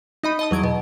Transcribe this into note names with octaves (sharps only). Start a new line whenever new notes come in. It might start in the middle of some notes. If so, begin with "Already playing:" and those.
D#4 D#5 B5
D#5 A5 D#6
E2 F#3 G#6 D7
B2